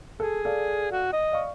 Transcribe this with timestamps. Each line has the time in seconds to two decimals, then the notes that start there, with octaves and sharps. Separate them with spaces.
0.20 G#4 A4
0.45 A4 D5 F5
0.92 F#4
1.13 D#5
1.32 D5 F5 C#6